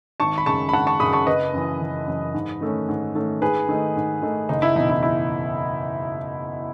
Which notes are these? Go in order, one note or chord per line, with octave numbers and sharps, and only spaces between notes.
G#1 A5 C#6
B5
F#2 C#3 G#3 A5 C#6
B5
G#1 F#5 A5
A5 C#6
F#2 C#3 G#3 B5 D#6
A5 C#6
F#1 B4 D#5
F#2 E3
F#1
F#2 E3
G#2
D#3 A3 C#4
G#2
D#3 A3 C#4
G#2 G#4 B4
D#3 A3 D#4
G#2
D#3 A3 D#4
F#1 D#4
E4
E2 B2 D#4
E4
E4